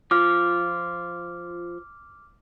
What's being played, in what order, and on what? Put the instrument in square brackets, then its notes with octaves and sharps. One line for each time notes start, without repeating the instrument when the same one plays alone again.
[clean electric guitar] F3 F4 [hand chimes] D6 F6